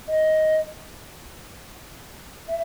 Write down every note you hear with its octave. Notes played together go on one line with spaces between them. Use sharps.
D#5
E5